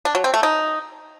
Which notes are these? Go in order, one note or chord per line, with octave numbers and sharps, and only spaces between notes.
D4
F#3
C4
A3
D#4